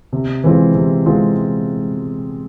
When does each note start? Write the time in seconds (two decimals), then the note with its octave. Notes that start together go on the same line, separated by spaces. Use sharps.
0.13 C3
0.44 E3 G#3 C4 F4
0.75 C3
1.06 E3 G#3 C4 F4